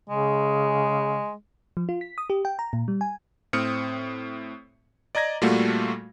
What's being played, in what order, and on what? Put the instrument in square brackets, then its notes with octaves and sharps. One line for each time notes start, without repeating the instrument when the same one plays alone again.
[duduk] C#3 [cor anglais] G#3
[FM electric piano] F3
F4
B6
D#6
G4
G5
A#5
A#2
G3
G#5
[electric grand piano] A2 C4 D#6 F6 C#7
D5 D#5 A#5 G#6 A#6
A#2 G3 A3 A#3 F4 F#4